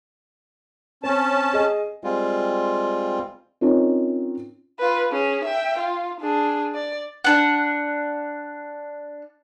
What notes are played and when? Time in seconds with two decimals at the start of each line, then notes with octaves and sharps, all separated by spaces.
1.03 C4 C#4 A5
1.53 G#4 D#5
2.04 G3 G#3 C4 F4
3.61 C4 C#4 D#4 F4 A#4 C#5
4.79 F4 B4
5.11 C#4 G#4
5.45 E5 G5
5.79 F4
6.21 D4 G#4
6.75 D5
7.24 D4 F#5